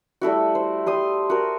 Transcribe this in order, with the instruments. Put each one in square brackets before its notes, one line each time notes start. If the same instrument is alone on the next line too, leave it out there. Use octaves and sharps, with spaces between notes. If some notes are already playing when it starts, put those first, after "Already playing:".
[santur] G3 A3 E4 F#4
C5
G3 C6 D#6
F#4 A#4